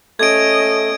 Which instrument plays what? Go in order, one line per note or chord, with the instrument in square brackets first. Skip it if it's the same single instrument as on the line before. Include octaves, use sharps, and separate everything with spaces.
[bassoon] A3 [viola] C#4 D#5 [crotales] G#6 D7